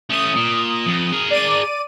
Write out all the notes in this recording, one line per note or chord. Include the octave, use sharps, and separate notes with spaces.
A3 C#4 D#6
A#2
F2
G#4 A#4
D5 D#7